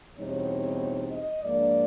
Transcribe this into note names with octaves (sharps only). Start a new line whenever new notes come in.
E2 B2 G3 C4 D#4 C#5
D#5
G#2 F3 A#3 D4 D5